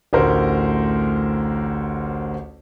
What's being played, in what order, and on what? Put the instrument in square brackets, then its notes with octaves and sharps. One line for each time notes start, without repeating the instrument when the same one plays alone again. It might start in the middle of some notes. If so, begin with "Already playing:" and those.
[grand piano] A1 D2 A#4 C5